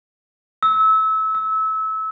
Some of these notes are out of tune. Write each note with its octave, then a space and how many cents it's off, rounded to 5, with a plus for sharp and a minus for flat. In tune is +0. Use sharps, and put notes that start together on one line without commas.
E6 -25
E6 -25